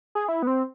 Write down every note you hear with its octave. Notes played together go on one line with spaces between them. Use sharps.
G#4
E4
B3
C4